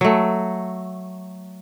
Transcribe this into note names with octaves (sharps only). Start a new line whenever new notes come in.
F#3 A3